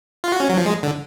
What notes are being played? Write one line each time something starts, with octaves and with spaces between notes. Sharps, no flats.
F4
F#4
C#4
F#3
F3
G#3
D3